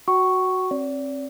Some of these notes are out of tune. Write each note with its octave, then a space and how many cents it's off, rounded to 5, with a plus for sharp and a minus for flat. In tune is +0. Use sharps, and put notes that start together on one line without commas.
F#4 +0 F#5 +40 C#6 +0
C4 +35 D5 -35